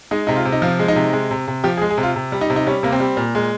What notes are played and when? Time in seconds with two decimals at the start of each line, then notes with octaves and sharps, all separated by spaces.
0.11 G#3 D#4
0.27 C3 D#4
0.36 F4
0.45 C3
0.52 D#4
0.62 F3 F4
0.79 G#3
0.88 D#4
0.96 C3
1.13 G#3
1.31 C3
1.48 C3
1.64 F3 G4
1.77 G#4
1.82 G#3
1.90 G#4
1.98 C3
2.03 F4
2.16 C3
2.32 G3
2.41 D#4
2.50 C3
2.56 D#4
2.67 G3 C#4
2.83 C3 A#3
2.92 C4
3.00 G3
3.17 A#2
3.35 G#3